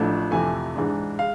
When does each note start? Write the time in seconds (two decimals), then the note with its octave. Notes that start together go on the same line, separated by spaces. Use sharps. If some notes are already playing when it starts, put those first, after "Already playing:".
Already playing: A1 A2 F3 A3 D4
0.31 F2 C3 E3 A3 G#5
0.76 G#2 E3 G#3 D4
1.19 G#3 F5